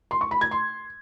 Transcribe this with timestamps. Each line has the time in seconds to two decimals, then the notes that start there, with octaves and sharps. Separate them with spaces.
0.11 C6
0.21 C#6
0.31 B5
0.41 G#6
0.51 C6